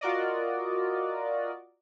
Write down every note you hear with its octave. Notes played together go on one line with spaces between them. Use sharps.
F4 F#4 A#4 D5 D#5